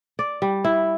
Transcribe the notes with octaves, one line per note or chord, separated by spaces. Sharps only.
D5
G3
E4